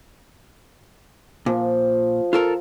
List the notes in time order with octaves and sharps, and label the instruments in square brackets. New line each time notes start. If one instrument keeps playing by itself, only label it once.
[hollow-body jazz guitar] A#2 [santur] F3
[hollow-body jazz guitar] F4 A4 A#4